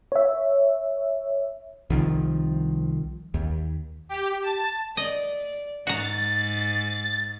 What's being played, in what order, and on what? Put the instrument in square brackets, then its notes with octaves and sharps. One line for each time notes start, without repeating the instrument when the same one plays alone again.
[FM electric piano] C#5 E5
[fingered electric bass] C2 D#3 F3
D#2
[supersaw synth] G4
A5
[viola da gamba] D5 [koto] D#5
[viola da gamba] G#2 [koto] F#4 A#5 [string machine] A6